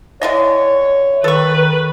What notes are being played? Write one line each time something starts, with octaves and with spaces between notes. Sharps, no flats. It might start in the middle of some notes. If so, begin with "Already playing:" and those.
D3 E3 C#5 D#5
D#3 A4 B4 C#6